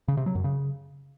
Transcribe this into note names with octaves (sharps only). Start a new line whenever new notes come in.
C#3
C3
F#3
F#2
C#3